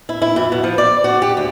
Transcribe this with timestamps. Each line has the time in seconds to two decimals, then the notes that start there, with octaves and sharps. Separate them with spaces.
0.09 E4
0.22 E4
0.36 F2
0.52 B2
0.64 F3
0.78 D5
1.04 F#4
1.22 G4
1.37 D2